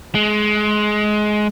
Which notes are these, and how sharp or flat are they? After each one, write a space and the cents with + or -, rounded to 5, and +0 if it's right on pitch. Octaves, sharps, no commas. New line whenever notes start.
G#3 +20